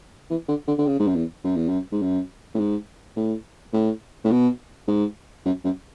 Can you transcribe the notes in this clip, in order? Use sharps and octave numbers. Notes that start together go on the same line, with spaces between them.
E3
D3
D3
D3
C#3
G#2
F#2
E2
F#2
E2
F#2
G#2
F#2
A2
G#2
A2
A2
A2
B2
G#2
F#2
F#2